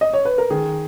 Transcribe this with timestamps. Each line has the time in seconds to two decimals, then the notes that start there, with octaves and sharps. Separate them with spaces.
0.01 D#5
0.13 C#5
0.25 B4
0.38 A#4
0.50 D#3 G#4